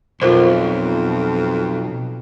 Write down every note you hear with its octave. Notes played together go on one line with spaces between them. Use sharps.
B1 F2 F4 A#4 C5